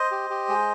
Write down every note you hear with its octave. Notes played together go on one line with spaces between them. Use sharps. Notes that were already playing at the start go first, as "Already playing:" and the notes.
Already playing: C5 D#5
G4
G4
G#3